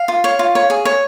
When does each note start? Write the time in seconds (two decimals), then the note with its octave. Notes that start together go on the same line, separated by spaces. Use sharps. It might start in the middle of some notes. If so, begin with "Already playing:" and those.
Already playing: F5
0.08 F4
0.24 C#5
0.39 F4
0.55 C#5
0.70 G#4
0.85 C#5